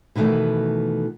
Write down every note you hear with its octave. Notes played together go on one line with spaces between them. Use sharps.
B2 D#3 E3 A3 B3